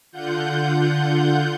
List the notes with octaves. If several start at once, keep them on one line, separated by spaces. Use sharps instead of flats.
D3 F4 F#5 G6